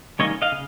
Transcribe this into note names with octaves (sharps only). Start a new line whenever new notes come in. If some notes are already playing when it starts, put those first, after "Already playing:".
D#3 G3 A#3 C#4 C#5 D#5
D#5 F5
C#3